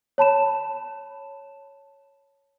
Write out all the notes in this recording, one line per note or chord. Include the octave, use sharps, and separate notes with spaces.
C#5 A5 B5 E7